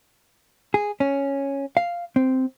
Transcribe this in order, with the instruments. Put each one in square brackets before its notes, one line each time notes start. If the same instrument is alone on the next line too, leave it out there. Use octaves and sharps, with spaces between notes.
[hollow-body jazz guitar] G#4
C#4
F5
C4